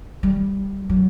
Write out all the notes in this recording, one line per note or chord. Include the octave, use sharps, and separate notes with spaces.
G3
F#3